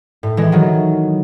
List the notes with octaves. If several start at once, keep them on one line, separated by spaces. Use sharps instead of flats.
A2
E3 G#3
D#3 F#3